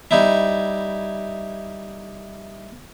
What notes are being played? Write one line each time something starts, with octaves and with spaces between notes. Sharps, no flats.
G3 D#4 E4